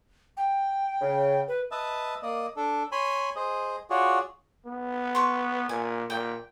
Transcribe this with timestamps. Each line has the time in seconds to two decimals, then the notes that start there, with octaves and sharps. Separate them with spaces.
0.37 G5
1.00 C#3
1.48 B4
1.71 B4 D#5 E5 A5
2.22 A#3 D5 D#5
2.56 D4 A4
2.92 C#5 G#5 B5 C6
3.36 G#4 C5 D#5
3.90 F4 F#4 G#4 C#5 D5
4.66 B3
5.15 C6 C#6
5.69 A#2 G#5
6.10 A#2 G5